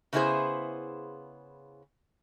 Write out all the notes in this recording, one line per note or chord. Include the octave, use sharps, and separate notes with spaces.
C#3 A3 B3 E4 G#4 C5